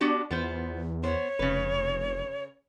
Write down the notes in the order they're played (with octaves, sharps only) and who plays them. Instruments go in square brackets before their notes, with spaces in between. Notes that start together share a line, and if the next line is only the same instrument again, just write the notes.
[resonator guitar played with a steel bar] B3 F#4 G4 [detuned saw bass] D4
[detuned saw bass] E2 [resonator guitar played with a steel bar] B3 F4 C5
[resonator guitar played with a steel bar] B3 C5 [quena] C#5
[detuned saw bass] F1 [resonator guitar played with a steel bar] C#3 B4